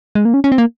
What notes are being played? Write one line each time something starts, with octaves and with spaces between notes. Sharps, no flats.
G#3
A#3
C#4
C#4
C4
A#3